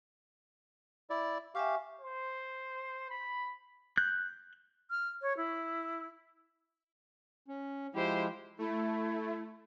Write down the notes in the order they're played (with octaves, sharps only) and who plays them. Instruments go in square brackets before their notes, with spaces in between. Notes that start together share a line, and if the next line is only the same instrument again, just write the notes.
[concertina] E4 D5
[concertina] G4 F5 [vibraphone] E5 G#5 C#6
[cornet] C5
B5
[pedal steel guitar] F#6 G6
[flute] F6
C#5
E4
[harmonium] C#4
[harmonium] F3 G#3 E4 [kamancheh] G4 C5
[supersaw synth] A3 [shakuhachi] E4